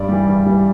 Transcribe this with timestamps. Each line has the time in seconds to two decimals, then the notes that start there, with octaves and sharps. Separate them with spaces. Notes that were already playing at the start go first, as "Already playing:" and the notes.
Already playing: G2 D5
0.09 E3 G3
0.27 G2
0.46 E3 G3